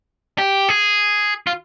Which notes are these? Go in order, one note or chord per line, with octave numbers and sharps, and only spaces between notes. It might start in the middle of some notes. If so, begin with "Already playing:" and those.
G4
G#4
F4